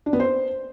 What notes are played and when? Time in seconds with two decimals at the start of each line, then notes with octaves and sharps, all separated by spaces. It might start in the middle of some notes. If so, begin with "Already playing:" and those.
0.06 D4
0.13 B3
0.20 C5